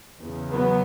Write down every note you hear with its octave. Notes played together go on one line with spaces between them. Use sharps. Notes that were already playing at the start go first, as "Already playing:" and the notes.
E2 C#3
F#3 B3